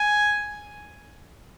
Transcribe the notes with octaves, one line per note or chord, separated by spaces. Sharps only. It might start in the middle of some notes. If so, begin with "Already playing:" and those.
Already playing: G#5